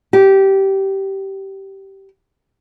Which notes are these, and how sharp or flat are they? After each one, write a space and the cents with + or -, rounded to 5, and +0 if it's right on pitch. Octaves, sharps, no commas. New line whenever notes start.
G4 -15